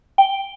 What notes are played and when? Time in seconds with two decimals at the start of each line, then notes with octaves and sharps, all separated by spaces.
0.18 G5